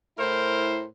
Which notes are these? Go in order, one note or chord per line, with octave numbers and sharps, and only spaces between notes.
A2 E4 A#4 C5